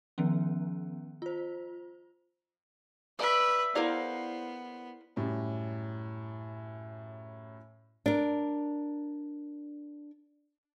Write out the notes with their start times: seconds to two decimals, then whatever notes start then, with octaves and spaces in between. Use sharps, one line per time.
0.18 D#3 F3 B3 C#4
1.22 F4 C5
3.19 B4 D5 E5
3.75 B3 E4 G#4 A#4 C5 D5 F5
5.16 F#2 A2 G3
8.06 D4 A#4